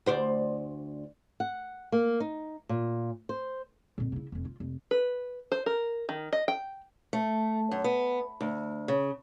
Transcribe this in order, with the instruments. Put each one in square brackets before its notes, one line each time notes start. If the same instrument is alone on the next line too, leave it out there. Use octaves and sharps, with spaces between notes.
[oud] D2 C5 D5
[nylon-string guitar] F#5
A#3
D#4
A#2
C5
[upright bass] F2 A#2
C#3 E4
F1 F2
F4
F1
[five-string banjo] B4
C5
A#4
D#3
D#5
G5
[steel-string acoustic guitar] A3
F#2
B3
D2
C#3